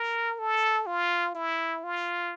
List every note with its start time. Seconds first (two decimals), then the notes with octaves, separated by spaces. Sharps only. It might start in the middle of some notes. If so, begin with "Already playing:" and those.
Already playing: A#4
0.39 A4
0.86 F4
1.35 E4
1.84 F4